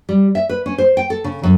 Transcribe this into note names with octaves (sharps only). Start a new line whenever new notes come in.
G3
E5
B4
C#4
C5
G5
A4
C#3
F#2